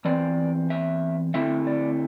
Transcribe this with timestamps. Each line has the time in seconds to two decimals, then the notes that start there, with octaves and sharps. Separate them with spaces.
0.05 E2 E3 C4 D5
0.70 E5
1.34 D3 A3 C4 E4 E5
1.67 D5